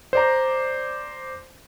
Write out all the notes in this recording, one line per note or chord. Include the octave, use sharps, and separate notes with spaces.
C5 D5 A#5